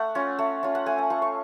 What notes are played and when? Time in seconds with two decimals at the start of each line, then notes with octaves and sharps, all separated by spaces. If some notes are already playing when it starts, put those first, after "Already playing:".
Already playing: A3 F#5
0.15 C#4 F4
0.39 A3
0.63 C#4 F4
0.75 F#5
0.86 A3 G#5
0.98 A5
1.10 F4 C#6
1.22 C#6